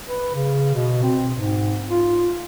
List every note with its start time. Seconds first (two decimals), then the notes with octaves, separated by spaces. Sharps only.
0.07 B4
0.34 C#3
0.74 B2
1.03 C4
1.35 G#2
1.90 F4